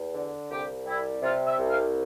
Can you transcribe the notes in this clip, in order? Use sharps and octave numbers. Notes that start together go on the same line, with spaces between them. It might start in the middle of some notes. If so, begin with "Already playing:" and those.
Already playing: E2
D3
C2 G4
G3 E4
C3 F4
E5
C2
F5